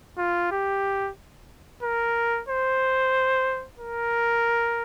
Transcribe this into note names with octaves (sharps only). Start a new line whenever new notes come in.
F4
G4
A#4
C5
A#4